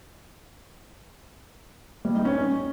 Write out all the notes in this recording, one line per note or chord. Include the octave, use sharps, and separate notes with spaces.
G3
D#4
C#4